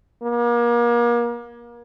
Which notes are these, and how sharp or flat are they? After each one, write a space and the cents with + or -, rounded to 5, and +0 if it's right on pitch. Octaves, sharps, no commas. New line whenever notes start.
A#3 +35